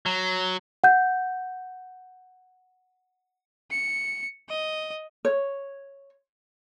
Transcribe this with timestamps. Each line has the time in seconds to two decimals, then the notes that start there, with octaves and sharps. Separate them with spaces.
0.06 F#3
0.84 F#5 G6
3.71 C#7
4.49 D#5
5.25 C#5